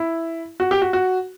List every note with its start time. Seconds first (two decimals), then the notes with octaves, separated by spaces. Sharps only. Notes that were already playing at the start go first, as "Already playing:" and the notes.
Already playing: E4
0.60 F#4
0.71 G4
0.82 F#4
0.93 F#4